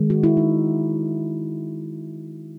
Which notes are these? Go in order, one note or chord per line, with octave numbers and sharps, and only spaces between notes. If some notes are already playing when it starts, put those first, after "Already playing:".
Already playing: D#3 G#3
F#4
E4
D#4